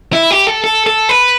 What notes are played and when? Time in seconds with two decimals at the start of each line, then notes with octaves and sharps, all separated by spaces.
0.13 E4
0.31 G4
0.47 A4
0.64 A4
0.86 A4
1.09 B4